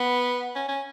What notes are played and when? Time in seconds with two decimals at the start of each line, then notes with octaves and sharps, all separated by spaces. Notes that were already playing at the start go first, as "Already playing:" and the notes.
Already playing: B3
0.55 C#4
0.68 C#4